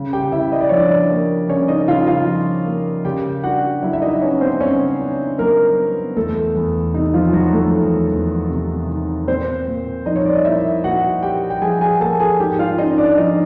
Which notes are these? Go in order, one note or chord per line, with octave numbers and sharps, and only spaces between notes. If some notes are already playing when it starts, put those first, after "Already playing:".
Already playing: C#3
G4 G5
C#3 E4 E5
D#5
D5
F3 C#5
D4 D5
A#3
C#3 C#4 C#5
D#4 D#5
C#3 F4 F5
F4 F5
F3
A#3
C#3 G4 G5
D4 F#4 F#5
F#3 E4 E5
E5
D#4 D#5
B3 C#4 C#5
C4 C5
C#3 C#4 C#5
D4
F#3 A#3 A#4
B3
E2 A3 A4
E2
C3 D#4
F3 F4
D#3 F#3 F#4
A3 A4
E2
E2
C3
D#3
A#2 C4 C5
A#2
F3 D#4 D#5
C#5
D5
D#5
A#3 E4 E5
A#2 F#4 F#5
A#2 G4 G5
G5
F3 G#4 G#5
G#4 G#5
A#3 A4 A5
G#4 G#5
G#2 G4 G5
F4 F5
C#4 D#4 D#5
D4 D5
F3 D#4 D#5